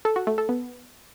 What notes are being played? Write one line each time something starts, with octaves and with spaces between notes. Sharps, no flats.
A4
F#4
A3
A4
B3